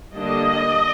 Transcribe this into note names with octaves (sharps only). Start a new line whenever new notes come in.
D3 G3 A#3 D4 D#5